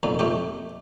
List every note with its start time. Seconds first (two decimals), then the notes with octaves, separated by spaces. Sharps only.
0.03 B1 F2 A#2
0.19 F2 A3 G4